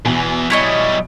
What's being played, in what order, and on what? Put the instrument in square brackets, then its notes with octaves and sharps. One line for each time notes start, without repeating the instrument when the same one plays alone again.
[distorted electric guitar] E2 E3 [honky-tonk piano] B2 G#5
[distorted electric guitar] F#3 G3 [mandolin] E4 C#5 D#5